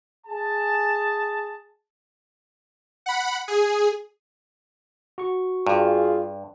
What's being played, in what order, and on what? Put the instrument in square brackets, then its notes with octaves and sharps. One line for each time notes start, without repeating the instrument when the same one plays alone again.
[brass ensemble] G#4 A5
[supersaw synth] F#5 B5
G#4
[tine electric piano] F#4 C#6
[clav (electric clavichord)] G2 [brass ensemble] F4 G#4